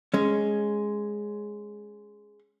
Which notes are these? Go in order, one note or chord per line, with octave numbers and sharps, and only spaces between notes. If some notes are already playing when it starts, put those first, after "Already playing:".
G#3 C#4